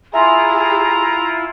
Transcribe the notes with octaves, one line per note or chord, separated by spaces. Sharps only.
E4 F4 G#4 E5 G#5 A#5 C6